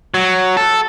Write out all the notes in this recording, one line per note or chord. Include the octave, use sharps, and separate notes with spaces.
F#3
A4